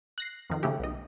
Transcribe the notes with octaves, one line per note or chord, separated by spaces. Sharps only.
F#6 A#6 C7
F2 D#3
C#3 A3 G4
B1 D#5